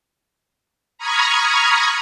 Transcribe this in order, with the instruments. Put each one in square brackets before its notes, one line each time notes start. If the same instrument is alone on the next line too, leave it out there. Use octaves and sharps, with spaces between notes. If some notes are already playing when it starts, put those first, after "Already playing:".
[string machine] A#5 B5 C#6 D#6 F6 G#6